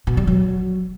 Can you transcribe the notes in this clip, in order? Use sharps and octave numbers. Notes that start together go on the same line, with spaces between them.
B2
G3
F#3